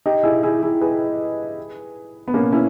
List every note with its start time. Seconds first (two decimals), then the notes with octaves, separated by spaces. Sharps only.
0.06 D#4 G4
0.24 E4 G#4
0.43 E4 G#4
0.62 E4 G#4
0.81 G#4 B4
2.28 B3
2.34 A#3 C#4
2.53 C#4 E4